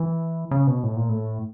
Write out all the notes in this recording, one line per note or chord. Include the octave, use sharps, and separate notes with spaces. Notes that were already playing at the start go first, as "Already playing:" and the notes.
Already playing: E3
C#3
B2
A2
A#2
A2